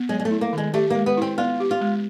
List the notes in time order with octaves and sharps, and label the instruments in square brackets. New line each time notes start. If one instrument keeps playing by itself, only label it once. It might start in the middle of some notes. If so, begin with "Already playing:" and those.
Already playing: [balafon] B3
[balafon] F#3 [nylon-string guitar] G#3
[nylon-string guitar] G#3
A3
[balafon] E4
[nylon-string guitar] A#3
[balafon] D#3
[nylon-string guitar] G#3
[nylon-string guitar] A3 [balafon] G4
[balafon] G#3 [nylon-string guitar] A#3
[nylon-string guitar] B3
[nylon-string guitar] C4 [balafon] E4
[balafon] B3 [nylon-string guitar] F4
[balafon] G4
[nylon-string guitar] F4
[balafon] G#3